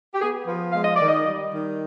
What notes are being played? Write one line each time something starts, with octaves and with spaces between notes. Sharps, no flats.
G4
B3 G#4
F3 B4
G#3 F5
D#5
D#3 D5
D#5
G3
D#3